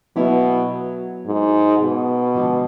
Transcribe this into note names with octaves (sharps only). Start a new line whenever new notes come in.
B2 F#3 B3 E4
G#2
B2
D3 F3 G#3